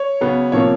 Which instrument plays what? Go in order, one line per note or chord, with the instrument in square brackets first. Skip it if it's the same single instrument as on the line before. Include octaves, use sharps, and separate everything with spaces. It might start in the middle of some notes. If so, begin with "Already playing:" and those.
Already playing: [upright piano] C#5
C#3 F#3 B3
C3 F3 A#3 C#5